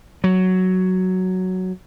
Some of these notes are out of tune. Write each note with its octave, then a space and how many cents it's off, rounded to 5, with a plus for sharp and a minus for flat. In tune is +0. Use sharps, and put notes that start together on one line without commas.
F#3 +5